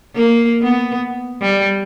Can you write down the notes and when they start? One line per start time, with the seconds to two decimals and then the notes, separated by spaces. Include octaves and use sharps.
0.15 A#3
0.62 B3
1.42 G3